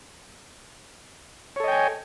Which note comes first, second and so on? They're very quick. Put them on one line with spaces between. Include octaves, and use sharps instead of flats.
C#5 A4 D#5 G5 G#5